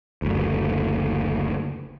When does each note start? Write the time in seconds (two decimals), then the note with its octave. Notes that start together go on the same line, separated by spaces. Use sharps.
0.22 F#1 D2